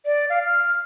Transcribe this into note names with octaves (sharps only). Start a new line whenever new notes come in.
D5
F5
F6